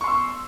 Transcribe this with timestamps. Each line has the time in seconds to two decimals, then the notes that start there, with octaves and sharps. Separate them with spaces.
0.01 C#6
0.04 C6
0.07 E6